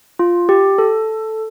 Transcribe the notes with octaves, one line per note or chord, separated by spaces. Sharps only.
F4
G4
A4